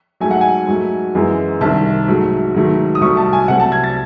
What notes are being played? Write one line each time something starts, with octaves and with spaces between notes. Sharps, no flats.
G#2 F#3 A3 G#5
F#5
G#5
G#2 F#3 A3
F#2 E3 G#3
C2 C3 D#3 A5
G#2 F#3 A3
G#2 D#3 F#3 A3
D#6
C2 C3 F#3 A3 C#6
A5
G#5
C2 C3 F#3 A3 F#5
A5
G#6
A6